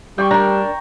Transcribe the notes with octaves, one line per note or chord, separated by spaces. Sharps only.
G3 G5 C#6
D4 A#4 A#5